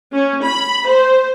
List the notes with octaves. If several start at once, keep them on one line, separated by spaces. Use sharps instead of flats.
C#4
B5
C5